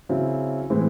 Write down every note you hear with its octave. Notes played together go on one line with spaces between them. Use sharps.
C#3 F#3 C4 E4
A2 E3 G#3 C4